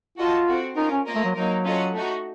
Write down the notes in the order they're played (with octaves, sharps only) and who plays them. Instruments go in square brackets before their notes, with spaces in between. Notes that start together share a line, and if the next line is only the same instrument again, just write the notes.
[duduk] F4 [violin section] F#4 A4 D#5 A5
[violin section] C4 F#4 A4
[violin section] C#4 F4 A#4 [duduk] D#4
[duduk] C#4
[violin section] A#3 F4 A#4 D#5
[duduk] A3
F#3
[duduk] F#3 [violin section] A#3 D#4 A#4
[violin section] C#4 F4 A4 D#5 F#5
A3 D#4 F#4